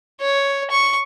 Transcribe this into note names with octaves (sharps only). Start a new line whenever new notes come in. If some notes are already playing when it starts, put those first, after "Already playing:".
C#5
C#6